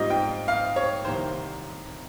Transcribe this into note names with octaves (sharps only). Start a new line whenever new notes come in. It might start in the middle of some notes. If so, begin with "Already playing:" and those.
Already playing: G#2 G3 C4 F4 D#5
G5
F5
C#5
C2 C3 D#3 A#3 C5